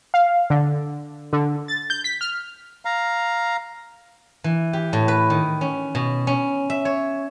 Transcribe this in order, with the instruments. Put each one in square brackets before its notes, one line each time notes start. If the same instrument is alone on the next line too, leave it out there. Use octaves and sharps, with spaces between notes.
[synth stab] F5
D3
D3
A6
G6
B6
F6
[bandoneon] F5 A#5
[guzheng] E3
G4
A2
B4
D#3
C#4
B2
C#4
E5
C#5